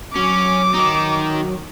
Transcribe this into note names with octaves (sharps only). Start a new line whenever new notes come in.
F#3 C#4 D6
D#3 D#4